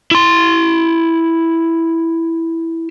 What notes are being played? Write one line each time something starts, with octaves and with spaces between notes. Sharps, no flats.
E4 C6